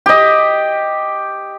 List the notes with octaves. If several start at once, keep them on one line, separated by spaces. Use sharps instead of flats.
G4 D#5